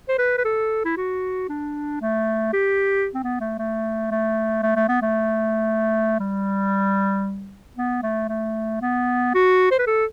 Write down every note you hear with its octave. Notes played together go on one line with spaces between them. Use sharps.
C5
B4
B4
A4
E4
F#4
D4
A3
G4
C4
B3
A3
A3
A3
A3
A3
B3
A3
G3
B3
A3
A3
B3
F#4
C5
B4
A4